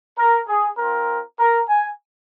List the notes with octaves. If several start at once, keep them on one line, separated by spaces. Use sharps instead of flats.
A#4
G#4
C4 F4 A#4
A#4
G#5